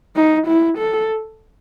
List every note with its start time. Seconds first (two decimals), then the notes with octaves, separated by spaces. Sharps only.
0.16 D#4
0.47 E4
0.78 A4